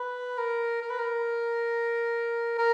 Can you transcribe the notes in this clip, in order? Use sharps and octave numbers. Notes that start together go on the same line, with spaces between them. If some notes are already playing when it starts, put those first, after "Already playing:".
Already playing: B4
A#4
A#4
B4
A#4
A#4